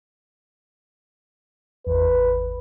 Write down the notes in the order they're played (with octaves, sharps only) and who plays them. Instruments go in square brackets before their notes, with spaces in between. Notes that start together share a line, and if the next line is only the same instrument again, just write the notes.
[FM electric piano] G#1 E2 [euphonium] B4